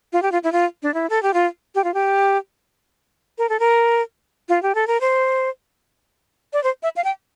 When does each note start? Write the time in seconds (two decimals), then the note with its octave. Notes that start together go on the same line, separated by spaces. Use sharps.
0.13 F4
0.22 G4
0.32 F4
0.44 E4
0.52 F4
0.83 D4
0.94 E4
1.10 A4
1.23 G4
1.34 F4
1.75 G4
1.84 F4
1.94 G4
3.38 A#4
3.49 A4
3.60 A#4
4.49 F4
4.63 G4
4.75 A4
4.87 A#4
5.01 C5
6.53 D5
6.64 C5
6.83 E5
6.96 F5
7.04 G5